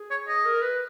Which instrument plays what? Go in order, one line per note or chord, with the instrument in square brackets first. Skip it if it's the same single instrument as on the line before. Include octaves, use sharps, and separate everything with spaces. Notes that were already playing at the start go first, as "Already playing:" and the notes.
Already playing: [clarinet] G#4
[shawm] C#5
D#5
[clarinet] A#4
B4